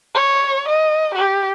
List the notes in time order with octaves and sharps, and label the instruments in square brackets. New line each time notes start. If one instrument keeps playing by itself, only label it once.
[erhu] C#5
D#5
G4